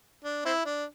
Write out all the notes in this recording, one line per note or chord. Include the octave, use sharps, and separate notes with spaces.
D4
C4 E4
D4